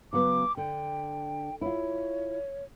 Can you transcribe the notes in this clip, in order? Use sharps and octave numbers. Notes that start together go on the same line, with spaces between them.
C#3 F#3 B3 D6
D3 G5
E4 F4 C#5